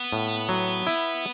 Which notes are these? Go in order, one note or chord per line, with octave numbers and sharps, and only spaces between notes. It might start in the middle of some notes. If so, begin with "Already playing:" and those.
Already playing: B3
A2
F#3
E4